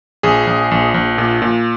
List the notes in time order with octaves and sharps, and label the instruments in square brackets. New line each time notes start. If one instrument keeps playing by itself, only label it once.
[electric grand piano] A#1 G#4
A#1
A#1
A#1
A#2
A#2